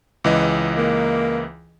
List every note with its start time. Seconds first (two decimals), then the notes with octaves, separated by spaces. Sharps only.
0.24 C#2 E3 D#5
0.77 A#3